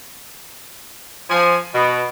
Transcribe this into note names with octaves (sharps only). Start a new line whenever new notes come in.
F3 G#5
B2